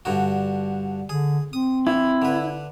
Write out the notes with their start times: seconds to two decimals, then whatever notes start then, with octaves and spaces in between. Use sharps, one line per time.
0.05 G2 D3 F#4
1.09 D3 G#4
1.53 C4 D#6
1.87 E3 E4
2.22 D3 B4